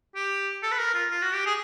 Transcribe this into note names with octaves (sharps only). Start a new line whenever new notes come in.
G4
A4
B4
A#4
F4
F4
F#4
G4
G#4